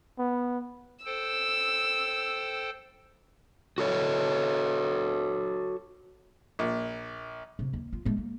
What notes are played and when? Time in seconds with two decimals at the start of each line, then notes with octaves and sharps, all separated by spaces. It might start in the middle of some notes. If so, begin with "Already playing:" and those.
0.18 B3
1.06 A4 C5 G5 E6
3.78 F#4 A4 C#5
6.59 A#1
7.59 C3
7.73 D#2
7.93 F4
8.05 G#3 A3
8.18 A#3